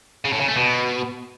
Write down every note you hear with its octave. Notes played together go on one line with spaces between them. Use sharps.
C#3
A2
C#3
A3
B2